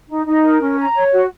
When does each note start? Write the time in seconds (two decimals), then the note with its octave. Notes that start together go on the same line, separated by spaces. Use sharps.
0.08 D#4
0.25 D#4
0.42 A#4
0.60 C#4
0.77 A#5
0.94 C#5
1.12 F#4